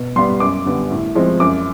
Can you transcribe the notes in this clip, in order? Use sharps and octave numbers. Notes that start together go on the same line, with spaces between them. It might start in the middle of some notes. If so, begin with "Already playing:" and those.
Already playing: B2
G3 B3 C6
F#2 D6
D3 G3 B3
A2
F3 G#3 C4
F#2 D6